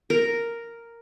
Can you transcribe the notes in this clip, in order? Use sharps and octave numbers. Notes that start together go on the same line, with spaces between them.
A#4